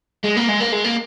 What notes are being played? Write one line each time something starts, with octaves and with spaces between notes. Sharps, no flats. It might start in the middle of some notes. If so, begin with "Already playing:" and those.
G#3
A#3
G#3
A#3
G#3
A#3